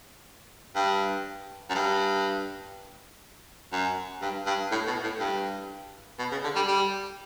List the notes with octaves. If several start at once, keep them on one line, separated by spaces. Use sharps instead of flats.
G2
F#2
G2
F#2
G2
G2
A2
B2
A2
G2
B2
C#3
D3
G3
G3